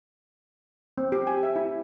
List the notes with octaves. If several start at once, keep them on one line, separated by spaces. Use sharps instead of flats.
C4
G4
G#5
E5
E4